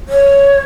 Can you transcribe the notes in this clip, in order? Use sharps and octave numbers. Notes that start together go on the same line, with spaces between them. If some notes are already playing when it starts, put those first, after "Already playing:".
C#5